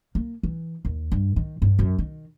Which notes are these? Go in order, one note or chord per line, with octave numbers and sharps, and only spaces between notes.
A#3
E3
D#2
G2
D#3
G2
F#2
D#3